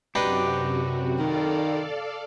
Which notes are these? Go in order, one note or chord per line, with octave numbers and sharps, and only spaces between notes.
F#2 C3 D4 D#4 F#4 G4 B4
D#3 A4 D5 F5